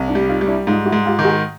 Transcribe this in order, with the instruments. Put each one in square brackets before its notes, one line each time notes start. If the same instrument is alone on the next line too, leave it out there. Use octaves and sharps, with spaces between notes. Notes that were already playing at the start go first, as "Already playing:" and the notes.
Already playing: [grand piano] C2
[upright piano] D4 E4
[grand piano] G3
[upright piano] D#4 F4
[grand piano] G3
[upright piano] D4 E4
[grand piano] G#2 [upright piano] D#4 F4
[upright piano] E4 F#4
[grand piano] G#2
[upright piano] F4 G4
[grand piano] D#3
[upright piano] F#4 G#4